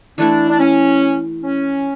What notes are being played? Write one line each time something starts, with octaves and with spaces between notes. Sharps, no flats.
E3 A3 D4 E4
D4
C#4
C#4